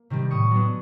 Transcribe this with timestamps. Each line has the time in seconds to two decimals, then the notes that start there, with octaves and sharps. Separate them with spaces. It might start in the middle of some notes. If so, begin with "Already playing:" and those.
Already playing: A#3
0.10 C3 D#3 G3
0.31 A2 C#6 D#6
0.51 F#3 B3 D4